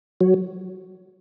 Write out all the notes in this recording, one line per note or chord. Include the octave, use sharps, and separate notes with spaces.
F#3